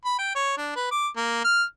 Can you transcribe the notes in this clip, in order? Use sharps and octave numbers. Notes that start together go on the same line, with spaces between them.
B5
G5
C#5
D4
B4
D6
A#3
F6